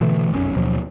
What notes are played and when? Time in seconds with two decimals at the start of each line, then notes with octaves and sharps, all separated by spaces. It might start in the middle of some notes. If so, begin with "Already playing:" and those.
0.01 B2 D3 E3 A3
0.30 F1 B1 F#2 C#4
0.56 D#2 B2 F3 F#3